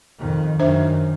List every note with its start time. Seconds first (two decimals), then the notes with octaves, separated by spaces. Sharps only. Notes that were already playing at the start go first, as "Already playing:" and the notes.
0.19 F2 D#3
0.59 F#2 D#3 D4 C5 E5